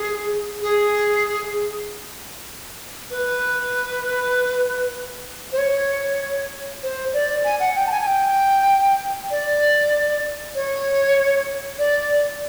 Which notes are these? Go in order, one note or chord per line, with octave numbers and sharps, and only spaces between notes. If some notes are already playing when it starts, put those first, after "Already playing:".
Already playing: G#4
G#4
B4
C5
C#5
C5
D5
G#5
F#5
G5
A5
G#5
G#5
G5
D5
C#5
D5